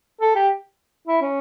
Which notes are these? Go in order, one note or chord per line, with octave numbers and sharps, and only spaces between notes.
A4
G4
E4
C#4